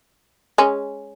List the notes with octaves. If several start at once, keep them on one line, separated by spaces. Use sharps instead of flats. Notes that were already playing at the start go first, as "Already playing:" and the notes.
G#3 C#4